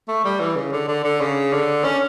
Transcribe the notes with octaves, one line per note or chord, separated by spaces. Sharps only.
A3
G3
E3
C#3
D3
D3
D3
C#3
D3
C#4